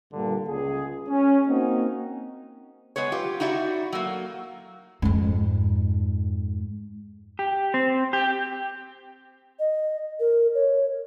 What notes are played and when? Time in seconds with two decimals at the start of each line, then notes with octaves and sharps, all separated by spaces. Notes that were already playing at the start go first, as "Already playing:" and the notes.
0.13 G2 A#2 D3
0.47 C#2 G#4
1.09 C#4
1.47 A#3 C4 D#4 F#4
2.96 G#3 B3 B4 C#5
3.12 F#3 F4 G4
3.40 D#4 E4 F#4 D5 E5
3.92 F#3 A3 A#3
5.02 F2 G#2
7.39 G4
7.74 C4
8.13 G4
9.59 D#5
10.20 A#4
10.55 C#5